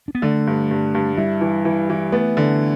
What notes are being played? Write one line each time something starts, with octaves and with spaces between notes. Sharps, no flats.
D4
B3
D3 A3
G2
G2
G2
G3 E4
E3
E3
E3
A3 B3
D3